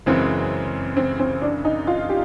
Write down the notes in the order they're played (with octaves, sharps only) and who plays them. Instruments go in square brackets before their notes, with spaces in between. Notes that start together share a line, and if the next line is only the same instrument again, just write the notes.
[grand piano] F#2 C#3 E3 G#3 [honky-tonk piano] C4
[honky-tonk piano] C4
C4
D4
D#4
F4
G4